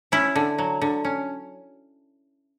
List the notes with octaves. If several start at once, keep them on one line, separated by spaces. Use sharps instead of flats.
C#4 E4
D3
F#3
D3
C#4